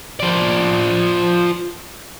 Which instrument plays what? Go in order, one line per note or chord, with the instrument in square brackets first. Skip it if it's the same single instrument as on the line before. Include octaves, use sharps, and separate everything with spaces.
[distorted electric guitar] F3 D5